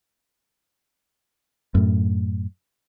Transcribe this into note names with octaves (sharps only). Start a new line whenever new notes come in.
F#2 A2